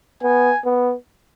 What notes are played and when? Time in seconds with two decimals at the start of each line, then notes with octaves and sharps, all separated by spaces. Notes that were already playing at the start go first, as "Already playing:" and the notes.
0.22 B3 G#5
0.65 B3